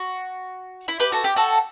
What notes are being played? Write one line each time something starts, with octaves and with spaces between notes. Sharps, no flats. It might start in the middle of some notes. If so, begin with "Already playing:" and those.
Already playing: F#4
E4
G4 B4
F#4 A4
G4
F#4 A4